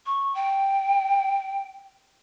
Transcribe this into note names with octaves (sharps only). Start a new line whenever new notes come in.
C#6
G5